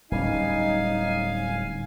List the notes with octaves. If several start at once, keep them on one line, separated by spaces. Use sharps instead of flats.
D1 G3 C#4 D#4 F5 G#5